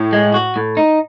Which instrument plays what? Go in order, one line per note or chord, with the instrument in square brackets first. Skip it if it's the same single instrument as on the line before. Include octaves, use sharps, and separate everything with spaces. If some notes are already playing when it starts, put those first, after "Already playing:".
Already playing: [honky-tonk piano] A2
[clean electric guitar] G#3
F#4
A2
D#4